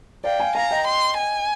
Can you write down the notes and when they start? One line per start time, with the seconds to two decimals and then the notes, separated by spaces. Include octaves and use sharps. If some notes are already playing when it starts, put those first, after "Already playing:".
0.24 D5 F5 G5
0.40 F5 G#5
0.55 F5 G#5 A#5
0.71 D#5 G5
0.87 C6
1.18 G#5